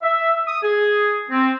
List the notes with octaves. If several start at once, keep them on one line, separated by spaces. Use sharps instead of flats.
E5
D#6
G#4
C4